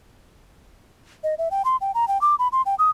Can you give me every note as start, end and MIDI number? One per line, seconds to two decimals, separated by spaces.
1.24 1.35 75
1.38 1.49 76
1.51 1.62 79
1.65 1.77 84
1.81 1.92 79
1.95 2.08 82
2.08 2.20 79
2.21 2.35 86
2.39 2.48 83
2.52 2.62 84
2.66 2.75 79
2.79 2.90 87